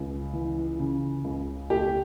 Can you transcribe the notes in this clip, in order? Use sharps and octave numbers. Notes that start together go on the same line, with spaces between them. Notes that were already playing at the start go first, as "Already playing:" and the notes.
Already playing: C#2
E3
C#3
C#2
A3 G4